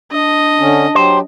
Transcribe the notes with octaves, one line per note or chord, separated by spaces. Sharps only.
D4 D#5
D3 C#4
F#3 G4 C5